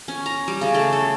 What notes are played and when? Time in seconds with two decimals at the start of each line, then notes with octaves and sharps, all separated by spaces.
0.08 C#4
0.26 A#5
0.48 G3
0.61 C#3
0.75 A3
0.93 A4